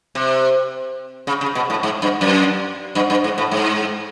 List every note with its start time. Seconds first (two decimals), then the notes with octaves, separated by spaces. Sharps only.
0.15 C3
1.27 C#3
1.41 C#3
1.55 B2
1.70 A2
1.83 G#2
2.02 G2
2.21 F#2
2.95 G2
3.10 G2
3.24 G#2
3.38 A2
3.51 G#2